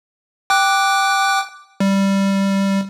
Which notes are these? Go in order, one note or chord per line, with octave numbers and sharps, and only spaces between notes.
G5 D6 F#6
G3